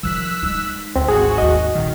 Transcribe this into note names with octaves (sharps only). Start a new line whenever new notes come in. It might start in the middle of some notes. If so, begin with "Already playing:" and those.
D#3 F3 E6 F#6 B6
G#3 D#4
D2 C4
G#1 F#4 G#4
D#2 G#2 D#5
A#1 F2 D#3